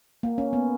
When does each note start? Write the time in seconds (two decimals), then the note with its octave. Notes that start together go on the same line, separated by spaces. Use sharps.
0.23 A#3
0.38 C#4
0.53 B3